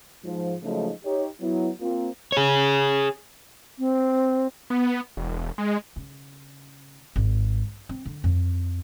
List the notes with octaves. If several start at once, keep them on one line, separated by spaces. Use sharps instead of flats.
G#2 F3
C#3 F3 F#3 G#3 A3 D#4
D#4 G4 C#5
F#3 B3 E4
A#3 C4 F4
G#4 C#5
C4
B3
E1
G#3
C#3
G#1
C4
D3
F2